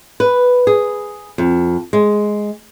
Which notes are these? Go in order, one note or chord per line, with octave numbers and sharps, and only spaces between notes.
B4
G#4
F2
G#3